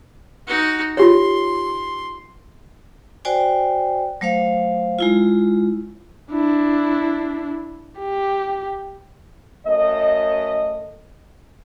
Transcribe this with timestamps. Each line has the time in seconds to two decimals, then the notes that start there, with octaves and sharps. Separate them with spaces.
0.47 D#4 F#4
0.97 F4 G4 C#5 C6
3.25 F#4 C5 D5 G5 G#5
4.21 F#3 A3 C5 F5
4.99 G#3 E4 F4
6.32 D4 E4
7.99 G4
9.65 F#2 A3 D#5